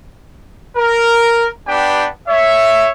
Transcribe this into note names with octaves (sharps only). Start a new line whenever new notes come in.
A#4
B3 D4 G4 B4 G5
C#5 E5